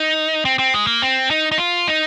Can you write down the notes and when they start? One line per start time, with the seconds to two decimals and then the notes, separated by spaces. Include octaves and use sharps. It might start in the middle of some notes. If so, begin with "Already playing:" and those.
Already playing: D#4
0.45 C4
0.59 C4
0.74 G#3
0.87 A#3
1.02 C4
1.30 D#4
1.52 D#4
1.58 F4
1.88 D#4